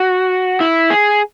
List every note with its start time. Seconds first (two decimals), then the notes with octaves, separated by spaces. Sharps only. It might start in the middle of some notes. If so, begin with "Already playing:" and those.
Already playing: F#4
0.61 E4
0.90 G#4